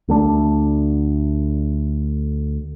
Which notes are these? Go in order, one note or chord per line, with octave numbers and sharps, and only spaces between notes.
D2 A3 D4